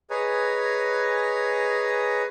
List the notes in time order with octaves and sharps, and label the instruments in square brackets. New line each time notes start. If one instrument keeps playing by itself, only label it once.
[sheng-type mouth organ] G#4 B4 C#5 D#5 G#5 A#5